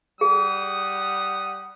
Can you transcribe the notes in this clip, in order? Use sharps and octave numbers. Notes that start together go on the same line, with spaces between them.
G3 G#4 F#5 D#6